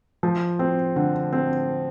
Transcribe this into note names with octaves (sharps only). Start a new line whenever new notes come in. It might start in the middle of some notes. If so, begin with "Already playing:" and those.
F3
C4
D3
C4